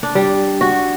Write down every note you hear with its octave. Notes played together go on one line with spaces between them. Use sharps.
D4
G3
F#4